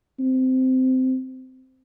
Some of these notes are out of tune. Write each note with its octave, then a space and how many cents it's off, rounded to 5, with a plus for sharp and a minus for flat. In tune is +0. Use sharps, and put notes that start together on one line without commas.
C4 -15